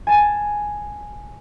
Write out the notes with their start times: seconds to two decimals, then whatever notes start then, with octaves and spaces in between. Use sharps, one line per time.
0.07 G#5 A5